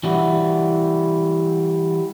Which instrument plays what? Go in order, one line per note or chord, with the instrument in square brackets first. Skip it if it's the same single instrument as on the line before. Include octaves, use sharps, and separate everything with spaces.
[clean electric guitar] E3 F#3 G3 E4 F#4